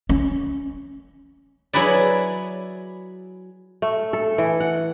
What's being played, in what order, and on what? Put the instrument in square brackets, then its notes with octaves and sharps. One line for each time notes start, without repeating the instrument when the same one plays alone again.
[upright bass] C#4
[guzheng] F#3 E4 G#4 B4 D5
[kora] A3
A4
E3
F#5